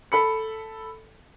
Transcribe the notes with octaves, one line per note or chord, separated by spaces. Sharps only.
A4 B5 C#7